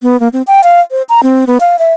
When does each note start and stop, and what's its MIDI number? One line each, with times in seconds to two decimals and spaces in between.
0.02 0.19 59
0.20 0.28 58
0.33 0.42 60
0.47 0.63 79
0.63 0.80 77
0.91 1.02 72
1.09 1.23 82
1.23 1.45 60
1.47 1.58 59
1.60 1.78 77
1.79 1.93 76